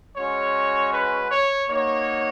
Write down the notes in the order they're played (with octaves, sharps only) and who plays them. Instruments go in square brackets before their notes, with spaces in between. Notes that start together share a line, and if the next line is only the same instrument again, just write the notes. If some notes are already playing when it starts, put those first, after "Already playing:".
[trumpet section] G#3 C#4 F#4 C#5
B4
C#5
A#3 D#4 F#4 C#5